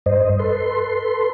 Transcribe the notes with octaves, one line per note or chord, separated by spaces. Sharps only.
G2 C5 D#5
A4 B4 C6